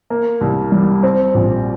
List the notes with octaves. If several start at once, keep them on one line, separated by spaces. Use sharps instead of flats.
A#3
C2
G3
C4
A#1